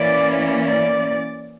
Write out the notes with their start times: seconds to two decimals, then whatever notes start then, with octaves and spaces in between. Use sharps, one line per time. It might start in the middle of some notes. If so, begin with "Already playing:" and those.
Already playing: E3 A#3 C#4 D5
0.64 D5